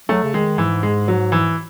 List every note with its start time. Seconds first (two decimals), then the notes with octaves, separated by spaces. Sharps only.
0.09 F#3 A3
0.24 C#3
0.34 D#3 G#3
0.58 G#2 E3
0.83 G#3
1.08 F#3
1.32 E3